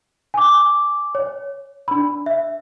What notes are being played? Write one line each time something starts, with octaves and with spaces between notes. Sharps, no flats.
G#5 D6
C#5
D4 B5
E5